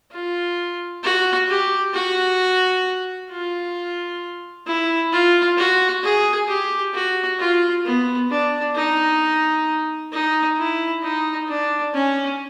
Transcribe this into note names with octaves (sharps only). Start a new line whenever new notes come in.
F4
F#4
G4
F#4
F4
E4
F4
F#4
G#4
G4
F#4
F4
B3
D4
D#4
D#4
E4
D#4
D4
C#4